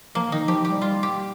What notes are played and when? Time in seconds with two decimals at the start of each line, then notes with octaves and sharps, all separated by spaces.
0.15 F3 A#3
0.32 D#3 D#4
0.48 F3 G4
0.65 G3 G4
0.81 F4
1.03 G4